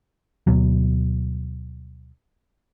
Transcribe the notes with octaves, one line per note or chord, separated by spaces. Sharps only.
D2 B2 F#3